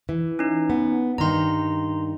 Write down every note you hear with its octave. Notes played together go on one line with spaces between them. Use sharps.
E3
C#4 D#4
B3
G2 D#3 D#4 A#5 C6